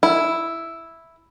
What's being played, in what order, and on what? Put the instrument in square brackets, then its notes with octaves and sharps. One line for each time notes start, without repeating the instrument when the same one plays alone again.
[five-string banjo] E4